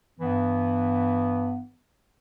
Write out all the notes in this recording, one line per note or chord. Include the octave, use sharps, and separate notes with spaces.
G2 E3 B3